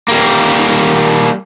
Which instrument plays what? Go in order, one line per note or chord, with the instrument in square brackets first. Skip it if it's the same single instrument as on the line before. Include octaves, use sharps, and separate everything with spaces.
[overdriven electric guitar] G3 A#3